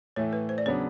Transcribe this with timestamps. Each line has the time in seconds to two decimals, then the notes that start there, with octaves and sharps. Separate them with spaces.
0.16 A2 E3 A3 C#5
0.33 B4
0.49 C5
0.58 D5
0.66 C#3 F#3 B3 D4 C#5